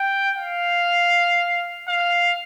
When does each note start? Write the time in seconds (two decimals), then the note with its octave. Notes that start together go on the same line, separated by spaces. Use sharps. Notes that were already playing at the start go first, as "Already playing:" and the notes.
Already playing: G5
0.36 F5
1.88 F5